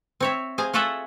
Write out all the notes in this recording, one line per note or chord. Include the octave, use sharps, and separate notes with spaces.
C4 C#5 E5
G#4 C5 F5 A#5
F4 F#4 G#4 A4 E5 F#5